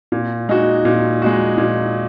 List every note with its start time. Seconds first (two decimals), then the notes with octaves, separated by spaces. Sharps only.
0.12 A#2
0.49 G#3 D#4 F#4
0.85 A#2
1.22 G#3 D#4 F#4
1.58 A#2